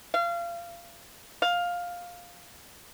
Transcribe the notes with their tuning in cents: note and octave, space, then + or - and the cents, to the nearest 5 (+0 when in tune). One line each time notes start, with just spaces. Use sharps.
F5 -30
F5 +10